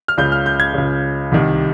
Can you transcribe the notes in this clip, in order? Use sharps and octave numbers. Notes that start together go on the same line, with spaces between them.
F6
C#2 C#3 G6
F6
G6
G#6
C#2 C#3
C2 C3 D#3